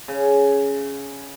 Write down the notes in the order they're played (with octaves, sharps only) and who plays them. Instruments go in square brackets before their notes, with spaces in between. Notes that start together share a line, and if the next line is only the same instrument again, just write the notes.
[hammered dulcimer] C#3